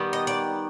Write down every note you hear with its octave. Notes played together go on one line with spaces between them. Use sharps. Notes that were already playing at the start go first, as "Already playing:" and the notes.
Already playing: D#3 G3 B3
D#5
D5